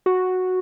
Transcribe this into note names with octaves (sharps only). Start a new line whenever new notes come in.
F#4